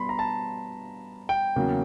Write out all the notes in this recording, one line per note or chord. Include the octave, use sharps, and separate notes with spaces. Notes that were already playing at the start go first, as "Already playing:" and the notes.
Already playing: B2 G3 B3 B5 C6
A#5
A5
G5
E2 C#3 F#3 A#3 C#4